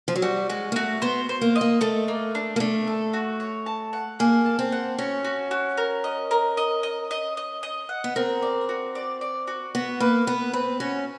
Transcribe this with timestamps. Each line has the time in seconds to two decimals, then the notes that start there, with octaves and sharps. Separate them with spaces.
0.08 F3
0.16 F#3
0.22 G3 F#4
0.49 G#3 F#4
0.72 A#3
0.76 A3 F#4
1.02 B3 C5
1.29 C5
1.41 A#3
1.56 D#5
1.61 A#3
1.81 A3 A4
2.08 A#3
2.35 D4
2.56 A#3
2.60 A3 D4
2.87 A4
3.13 F#4
3.40 C#5
3.66 A5
3.93 F#5
4.19 A#3 G#4
4.46 A5
4.59 C4
4.72 F#5
4.98 C#4 F#4
5.24 F#4
5.51 F#4
5.77 A#4
6.04 D#5
6.31 A#4
6.57 D#5
6.83 D#5
7.11 D#5
7.37 D#5
7.63 D#5
7.89 F#5
8.04 B3
8.16 C4 A#4
8.42 D5
8.69 F#4
8.95 D5
9.21 D5
9.47 F#4
9.75 B3 F#4
10.00 A#3 B4
10.27 B3 B4
10.53 C4 B4
10.80 C#4 F#4